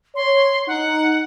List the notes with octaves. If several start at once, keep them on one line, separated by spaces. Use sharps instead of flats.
C#5 C6
D#4 F#5